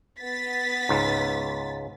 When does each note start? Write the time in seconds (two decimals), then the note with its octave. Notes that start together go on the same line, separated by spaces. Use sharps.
0.19 B3 A6 B6
0.89 C#2 G#2